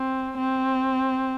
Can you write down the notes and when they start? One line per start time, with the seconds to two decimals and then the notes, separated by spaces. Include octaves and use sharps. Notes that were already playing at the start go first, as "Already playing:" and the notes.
Already playing: C4
0.37 C4